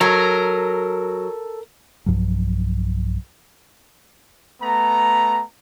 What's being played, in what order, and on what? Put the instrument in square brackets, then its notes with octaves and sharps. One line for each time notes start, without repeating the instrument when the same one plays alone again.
[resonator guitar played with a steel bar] F#3 [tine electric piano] A4 [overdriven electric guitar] A#4
[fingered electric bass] B1 G2 F3 F#3
[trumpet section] A3 B3 A#5